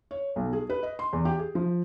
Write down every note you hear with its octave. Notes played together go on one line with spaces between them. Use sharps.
C#5
B1
G#4
B4
D#5
C6
E2
G4
G#4
F3